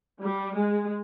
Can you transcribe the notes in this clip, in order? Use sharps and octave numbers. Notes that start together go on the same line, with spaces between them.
G3
G#3